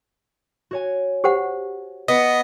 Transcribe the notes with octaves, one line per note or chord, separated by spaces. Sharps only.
F#4 C#5 G#5
G4 C5 F#5
B3 D#5